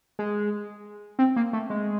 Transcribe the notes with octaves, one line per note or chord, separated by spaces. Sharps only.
G#3
C4
A#3
A3
G#3